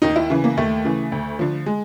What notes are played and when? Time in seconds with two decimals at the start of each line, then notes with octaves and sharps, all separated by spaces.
0.02 D#2 D#4
0.16 E4
0.30 C#3 E3
0.44 A#3
0.57 D#2 A3
0.84 C#3 E3
1.12 D2
1.39 D3 F3
1.66 G#3